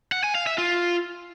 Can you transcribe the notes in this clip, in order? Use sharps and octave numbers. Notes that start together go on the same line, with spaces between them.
F#5
G#5
F5
E5
F4